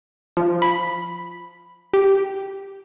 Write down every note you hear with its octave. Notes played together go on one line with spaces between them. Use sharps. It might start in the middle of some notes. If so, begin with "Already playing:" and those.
F3
B5
G4